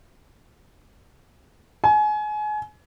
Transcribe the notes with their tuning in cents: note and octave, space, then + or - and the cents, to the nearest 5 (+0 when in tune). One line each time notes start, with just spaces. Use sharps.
G#5 +30